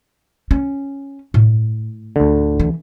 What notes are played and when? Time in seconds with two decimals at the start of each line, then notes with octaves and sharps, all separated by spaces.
0.51 C#4
1.34 A2
2.16 D2 D3
2.60 E3